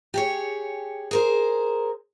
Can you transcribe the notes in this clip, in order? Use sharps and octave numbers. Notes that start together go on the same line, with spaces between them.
G4 G#4 C#5
G#4 A#4 C5